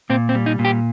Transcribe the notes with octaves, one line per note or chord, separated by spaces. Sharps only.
A#2 C4
C4
G3
D#4
A#2
G4